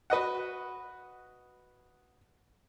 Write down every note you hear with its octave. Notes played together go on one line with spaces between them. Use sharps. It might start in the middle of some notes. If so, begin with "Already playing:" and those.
F#4 B4 D#5 F#5